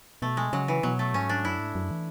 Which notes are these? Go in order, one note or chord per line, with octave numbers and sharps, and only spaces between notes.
B2 A3
G#3
C#3 F#3
E3
B2 F#3
A3
G#2 C#4
D4
F#2 E4
G#2
F#2
E3